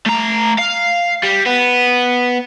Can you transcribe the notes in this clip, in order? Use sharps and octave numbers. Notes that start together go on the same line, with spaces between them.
A3 A#5
F5
G3
B3